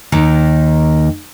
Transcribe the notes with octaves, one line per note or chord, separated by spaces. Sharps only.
D#2 D#3